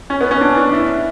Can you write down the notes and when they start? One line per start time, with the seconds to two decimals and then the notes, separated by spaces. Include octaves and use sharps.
0.10 C#4
0.21 B3
0.31 C#4
0.41 D4
0.57 D4
0.73 E4